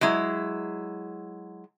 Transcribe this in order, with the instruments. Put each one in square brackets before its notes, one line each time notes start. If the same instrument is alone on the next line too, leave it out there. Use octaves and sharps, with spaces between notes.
[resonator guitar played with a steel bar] F#3 G#3 E4